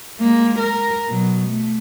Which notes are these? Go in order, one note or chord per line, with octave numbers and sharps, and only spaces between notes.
G#3 A#3
A#4
B2 F#3
A3